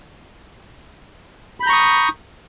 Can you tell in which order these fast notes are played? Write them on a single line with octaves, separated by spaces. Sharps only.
B5 G6 A#5 C#6 D#6